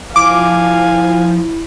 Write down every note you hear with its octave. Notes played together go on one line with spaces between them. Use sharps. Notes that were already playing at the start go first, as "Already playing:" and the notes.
F3 E4 F5 G#5 D6